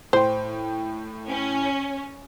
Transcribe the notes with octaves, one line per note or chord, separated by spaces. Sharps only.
A2 C5 G5
C#4